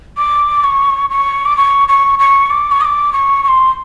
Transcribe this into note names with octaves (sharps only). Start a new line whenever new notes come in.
D6
C#6
C#6
D6
C#6
C#6
C#6
D6
C#6
D#6
D6
C#6
C#6
C6